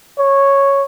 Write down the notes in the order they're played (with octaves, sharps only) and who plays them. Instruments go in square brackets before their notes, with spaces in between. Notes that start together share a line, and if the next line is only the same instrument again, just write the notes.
[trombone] C#5